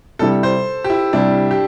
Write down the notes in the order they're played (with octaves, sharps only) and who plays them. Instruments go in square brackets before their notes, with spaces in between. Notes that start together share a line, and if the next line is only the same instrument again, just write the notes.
[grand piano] C3 G3 E4 [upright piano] A4
[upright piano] C5
G4
E4
[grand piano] C3 G3 E4 [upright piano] D4
[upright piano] G4